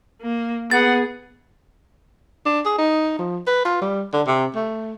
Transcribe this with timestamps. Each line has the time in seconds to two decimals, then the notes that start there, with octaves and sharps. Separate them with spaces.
0.22 A#3
0.71 B3 G#4 F#5 A6
2.46 D4
2.66 G#4
2.78 D#4
3.19 F3
3.47 B4
3.65 F4
3.82 G3
4.13 D3
4.27 C3
4.55 A3